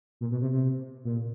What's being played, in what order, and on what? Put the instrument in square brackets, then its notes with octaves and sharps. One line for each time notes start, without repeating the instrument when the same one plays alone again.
[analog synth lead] A#2
B2
C3
C3
A#2